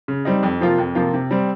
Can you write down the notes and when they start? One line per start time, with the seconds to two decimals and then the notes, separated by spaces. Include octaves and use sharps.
0.08 C#3
0.25 G3 C4 D#4
0.43 F2
0.61 C3 F3 A#3 F4
0.78 F2
0.95 C3 F3 A#3 F4
1.14 C3
1.31 G3 C4